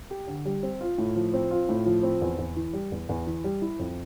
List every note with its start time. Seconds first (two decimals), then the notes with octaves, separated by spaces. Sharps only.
0.11 G4
0.27 D3
0.45 G3
0.63 C4
0.81 F4
0.98 A2
1.16 F3
1.34 C4
1.51 F4
1.69 A2
1.86 F3
2.03 C4
2.22 E2
2.38 E2
2.56 E3
2.73 G3
2.92 E2
3.09 E2
3.27 E3
3.44 G3
3.62 E4
3.79 F2